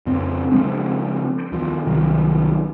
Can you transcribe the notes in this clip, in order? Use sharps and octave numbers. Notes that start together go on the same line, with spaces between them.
F2 C#3 C4
C#3 F3 G#3 C4
D#2 F3
C2 D#3 F#3